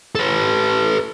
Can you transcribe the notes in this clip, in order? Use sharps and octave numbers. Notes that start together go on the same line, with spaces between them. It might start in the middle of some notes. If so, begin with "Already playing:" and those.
A4 B4